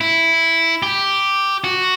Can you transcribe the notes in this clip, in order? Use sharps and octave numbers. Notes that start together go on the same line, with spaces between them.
E4
G4
F#4